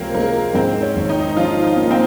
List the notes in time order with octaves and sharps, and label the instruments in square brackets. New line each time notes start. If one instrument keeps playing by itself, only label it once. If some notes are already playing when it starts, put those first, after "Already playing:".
Already playing: [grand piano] C#2 C3 F3 [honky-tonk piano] A#3 C4 C#4
[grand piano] G#3 [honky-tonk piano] A#3
[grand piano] G#2 [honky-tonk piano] C4
[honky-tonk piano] C#4
[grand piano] G#1
[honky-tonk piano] D#4
[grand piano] F3 [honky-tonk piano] F4
[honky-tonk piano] D#4
[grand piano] A#3
[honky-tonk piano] C4